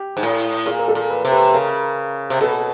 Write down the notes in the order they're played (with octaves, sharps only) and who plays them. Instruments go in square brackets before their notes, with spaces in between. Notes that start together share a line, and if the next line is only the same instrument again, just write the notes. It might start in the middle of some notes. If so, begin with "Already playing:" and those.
Already playing: [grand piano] G4
[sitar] G#2
A2
[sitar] A#2 [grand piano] G#4
[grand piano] A#4
A4
[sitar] A#2
[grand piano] B4
[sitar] C3
[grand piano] B4
[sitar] C#3 [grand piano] A#4
[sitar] C3
[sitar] B2 [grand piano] A4